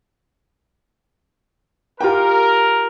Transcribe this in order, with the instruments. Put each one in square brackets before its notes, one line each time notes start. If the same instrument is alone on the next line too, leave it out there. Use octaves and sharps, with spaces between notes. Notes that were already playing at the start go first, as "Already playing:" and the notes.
[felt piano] F4 G4 G5 [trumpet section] A#4